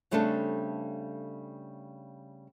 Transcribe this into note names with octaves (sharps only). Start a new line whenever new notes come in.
C#3 G3 A3 C4 D4 A4